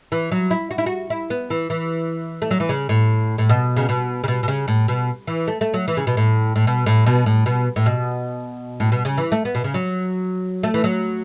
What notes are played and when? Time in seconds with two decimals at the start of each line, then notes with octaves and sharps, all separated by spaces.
0.12 E3
0.32 F#3
0.51 E4
0.71 F#4
0.78 E4
0.86 F#4
1.10 E4
1.30 B3
1.50 E3
1.70 E3
2.42 A3
2.51 F#3
2.60 E3
2.69 C#3
2.89 A2
3.38 A2
3.49 B2
3.77 C#3
3.89 B2
4.24 C#3
4.28 B2
4.43 B2
4.48 C#3
4.68 A2
4.88 B2
5.27 E3
5.47 A3
5.61 A3
5.74 F#3
5.88 E3
5.97 C#3
6.07 B2
6.17 A2
6.56 A2
6.67 B2
6.86 A2
7.06 B2
7.26 A2
7.46 B2
7.76 A2
7.86 B2
8.80 A2
8.92 B2
9.05 C#3
9.18 E3
9.32 A3
9.45 B3
9.55 B2
9.64 C#3
9.74 F#3
10.63 A3
10.74 E3
10.84 F#3